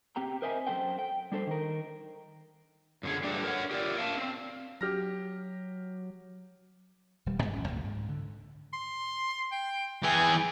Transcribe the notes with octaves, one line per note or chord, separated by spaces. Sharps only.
C4 G4 G5 A#5
A#4 C5 D#5 E5 G5 G#5
F#2 G#3 A4 C5 G5
G5
G3 D4 A4 C5
D#3 A#4
F#2 D3 G#4
G3 D4 A4 B4
A#4 C#5 F#5
G4 A#4 B4 D5
A#4 F5 A5
C4
F#3 G4 F6 A#6
D#1 G3
G2 G#3 C4
D#1 F#2 A#2 C#4
C#2 F#2 A2 A#3
G#2
D3
C6
G5
E3 G#4 G5